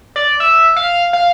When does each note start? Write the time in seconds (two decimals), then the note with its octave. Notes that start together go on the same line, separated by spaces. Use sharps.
0.16 D5
0.40 E5
0.76 F5
1.13 F5